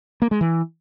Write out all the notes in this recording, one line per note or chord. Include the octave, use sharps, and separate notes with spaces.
A#3
G#3
E3